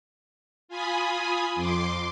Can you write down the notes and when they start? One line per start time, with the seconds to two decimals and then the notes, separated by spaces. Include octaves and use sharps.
0.68 F4 G#5 B5 D#6
1.55 F2 C6 D6